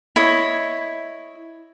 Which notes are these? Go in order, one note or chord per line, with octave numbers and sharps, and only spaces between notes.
E4 C#5 D#5